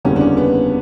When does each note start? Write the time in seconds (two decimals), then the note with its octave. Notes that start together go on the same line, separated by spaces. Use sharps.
0.05 F#1 E2 D3 G3 A#3 C#4
0.16 D4
0.21 C#4
0.37 B3